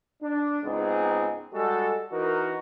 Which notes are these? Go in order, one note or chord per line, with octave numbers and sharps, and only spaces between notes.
D4
C#2 G#2 B3 C4 D#4 G#4
G3 G#3 F#4 A4
E3 D#4 F#4 A#4